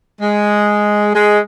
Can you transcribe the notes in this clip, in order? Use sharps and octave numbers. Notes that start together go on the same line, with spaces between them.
G#3
G#3